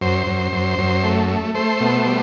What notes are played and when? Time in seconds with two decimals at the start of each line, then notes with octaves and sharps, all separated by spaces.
0.01 F#2 C5
0.27 F#2
0.52 F#2
0.78 F#2
1.03 A3
1.29 A3
1.55 A3 C5
1.80 B2
2.06 G3